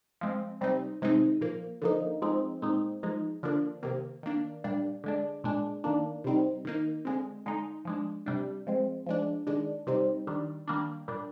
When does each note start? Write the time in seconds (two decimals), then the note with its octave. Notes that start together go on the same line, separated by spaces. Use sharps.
0.21 F3 G#3 C4
0.61 C3 G3 C4 D#4
1.02 C3 D#3 G#3 C4 D#4
1.41 A#2 F3 A#3
1.82 D3 F3 A#3 D#4
2.22 F3 G#3 C4 D#4
2.62 A#2 G#3 C4 D#4
3.03 F3 G#3 D#4
3.43 D3 F3 A#3 D4
3.83 C3 D#3 A#3
4.23 D#3 A#3 D4
4.64 A#2 G3 D4
5.04 D3 G#3 D4
5.44 A#2 G#3 D4
5.84 D#3 A#3 D4
6.24 C3 G3 C4 D#4
6.65 D#3 A#3 D#4
7.05 D3 G#3 C4
7.46 D3 G#3 D#4
7.85 F3 G#3 D4
8.26 C3 G3 D4
8.67 F3 G#3 C4
9.06 F3 G#3 D4
9.47 D#3 G#3 D4
9.87 C3 G3 C4 D#4
10.27 D#3 G3 D4
10.68 D#3 G3 A#3 D4
11.08 A#2 G3 D4